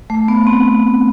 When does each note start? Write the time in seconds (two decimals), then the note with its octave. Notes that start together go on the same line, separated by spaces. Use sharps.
0.10 A3
0.28 B3
0.47 C4